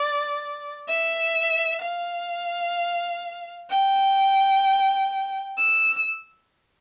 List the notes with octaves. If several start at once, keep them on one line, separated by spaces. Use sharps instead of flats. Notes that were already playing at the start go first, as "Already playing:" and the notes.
Already playing: D5
E5
F5
G5
E6